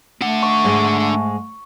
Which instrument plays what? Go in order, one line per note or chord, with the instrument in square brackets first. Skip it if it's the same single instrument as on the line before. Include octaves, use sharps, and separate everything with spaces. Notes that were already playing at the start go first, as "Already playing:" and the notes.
[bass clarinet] A3 [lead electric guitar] D4 F#5
[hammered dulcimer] C#6
[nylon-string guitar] G#2 G#3